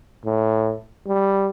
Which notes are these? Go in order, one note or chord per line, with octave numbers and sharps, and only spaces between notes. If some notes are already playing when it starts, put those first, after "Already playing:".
A2
G3